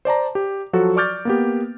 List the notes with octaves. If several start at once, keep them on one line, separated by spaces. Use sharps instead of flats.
C5 D5 A5 A#5
G4
F3 F#3 F#4 A4
D5 C#6 D6 F6 G6 A6
A#3 B3 G4